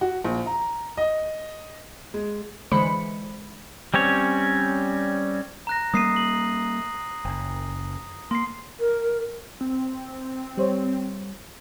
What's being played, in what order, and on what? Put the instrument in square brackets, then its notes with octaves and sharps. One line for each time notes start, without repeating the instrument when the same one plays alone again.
[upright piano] F#4
A#1
A#5
D#5
G#3
[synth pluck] D3 E3 G#3 C5 B5 C#7
[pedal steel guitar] G3 C4 C#4 C#5
[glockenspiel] A#5 F#6 A#6
[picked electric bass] G3 A#3 [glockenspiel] D#6 C7 D#7
[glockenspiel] F#7
[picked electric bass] F#1
[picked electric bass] A#3 [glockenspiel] C6 C7
[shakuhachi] A#4
[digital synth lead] C4
[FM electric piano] G3 C5 C#5